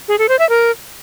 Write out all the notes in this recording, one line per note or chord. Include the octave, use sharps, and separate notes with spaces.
G#4
A4
C5
E5
A#4